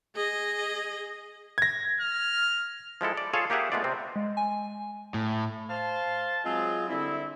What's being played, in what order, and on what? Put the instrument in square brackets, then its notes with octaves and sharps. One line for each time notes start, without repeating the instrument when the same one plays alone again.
[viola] G#4 D#5
[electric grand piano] G#6 A#6
[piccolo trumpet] F6
[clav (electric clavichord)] F3 G#3 E4 A4
D5
F4 G#4 A4 C#5 F5
A#3 G4 G#4 E5 F#5
G#3 A3 B3 F4 D5
C3 C4
[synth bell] G#3
G#5
[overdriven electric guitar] A2
[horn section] C5 F5 A5
F#3 G#3 C4 F4 G#4
D3 G3 C4 E4